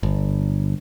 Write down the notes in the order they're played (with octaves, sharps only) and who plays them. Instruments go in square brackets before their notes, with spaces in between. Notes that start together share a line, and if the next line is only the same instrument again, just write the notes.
[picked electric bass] G1